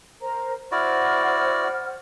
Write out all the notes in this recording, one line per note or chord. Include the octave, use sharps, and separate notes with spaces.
A#4 C5 A#5
E4 F#4 C5 D5 F#5 F6